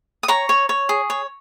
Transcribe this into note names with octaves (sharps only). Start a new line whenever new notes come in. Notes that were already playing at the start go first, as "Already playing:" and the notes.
D#6
C#5 A#5 C#6
C#5
C#5
G#4
C#5